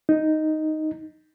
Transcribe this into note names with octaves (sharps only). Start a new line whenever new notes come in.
D#4